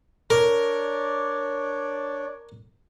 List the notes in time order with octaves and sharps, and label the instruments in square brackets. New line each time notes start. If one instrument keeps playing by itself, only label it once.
[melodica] D4 C#5 D5 [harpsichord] A#4